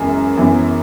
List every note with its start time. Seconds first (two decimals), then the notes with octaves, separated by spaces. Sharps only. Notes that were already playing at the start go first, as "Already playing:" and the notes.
Already playing: F#2 E3 G#3 B3
0.36 F#2 E3 B3